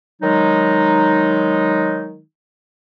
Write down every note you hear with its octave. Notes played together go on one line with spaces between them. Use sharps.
D#3 F#3 G#3 D#4